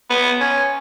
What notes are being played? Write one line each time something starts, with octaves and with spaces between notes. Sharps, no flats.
B3
C#4